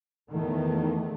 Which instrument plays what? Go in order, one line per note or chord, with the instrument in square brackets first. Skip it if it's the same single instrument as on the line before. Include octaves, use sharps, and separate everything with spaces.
[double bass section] E2 D#3 A3